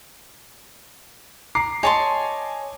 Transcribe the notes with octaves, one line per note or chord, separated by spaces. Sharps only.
A#5 D6 C7
C#5 D#5 G#5 A5 C6